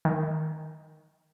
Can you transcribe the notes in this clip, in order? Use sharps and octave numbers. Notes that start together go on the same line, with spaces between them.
D#3